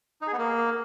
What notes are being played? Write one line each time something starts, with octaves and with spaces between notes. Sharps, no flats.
D#4
G#4
B3
A#3